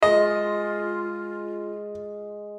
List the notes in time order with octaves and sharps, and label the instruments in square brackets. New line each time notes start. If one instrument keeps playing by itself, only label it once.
[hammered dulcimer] G#3 [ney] F4 [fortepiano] D#5